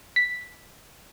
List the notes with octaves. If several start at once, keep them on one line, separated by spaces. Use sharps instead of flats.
B6